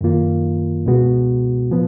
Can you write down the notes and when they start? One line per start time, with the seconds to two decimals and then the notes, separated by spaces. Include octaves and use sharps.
0.01 F#2 D#3 A#3 F4
0.86 C#2 B2 G#3 B3 F#4
1.71 A#2 F3 B3